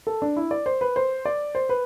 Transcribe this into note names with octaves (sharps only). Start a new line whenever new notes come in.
A4
D4
E4
D5
C5
B4
C5
D5
C5
B4